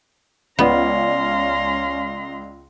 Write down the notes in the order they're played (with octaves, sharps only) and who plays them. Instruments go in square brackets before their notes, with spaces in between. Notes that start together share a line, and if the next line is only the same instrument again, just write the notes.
[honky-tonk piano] C#2 D5 [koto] B3 [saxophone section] C#4 F5 [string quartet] A#5 C6